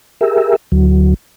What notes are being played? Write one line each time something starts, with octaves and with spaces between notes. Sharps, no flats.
G4 G#4 A#4 E5
D2 F#3